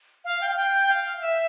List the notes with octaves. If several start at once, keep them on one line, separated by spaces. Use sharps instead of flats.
F5
G5
F5
G5
F5
F5
E5